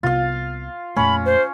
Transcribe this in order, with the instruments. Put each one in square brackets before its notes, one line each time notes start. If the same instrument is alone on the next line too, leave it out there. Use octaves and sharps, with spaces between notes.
[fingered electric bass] C2 C3 B3 [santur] F4 F5
[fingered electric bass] F2 A#2 A3 [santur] C#4 [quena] B5
[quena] C5